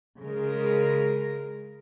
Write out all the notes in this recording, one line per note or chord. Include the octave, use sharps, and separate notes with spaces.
C#3 G#3 A#4